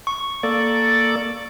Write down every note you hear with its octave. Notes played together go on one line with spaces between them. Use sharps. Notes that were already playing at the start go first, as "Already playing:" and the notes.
C#6
A#3 A4 D5